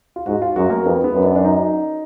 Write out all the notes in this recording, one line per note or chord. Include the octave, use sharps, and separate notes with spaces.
F4
G#2 F#4
F4
F#2 F#4
A#3
F2 B3
B3
F#2
D4
D4
D#4